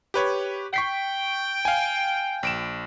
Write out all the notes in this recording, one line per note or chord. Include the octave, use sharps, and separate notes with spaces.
G4 B4 C#5
G5 C#6 B6 C7
F5 G#5
A#1 D7 E7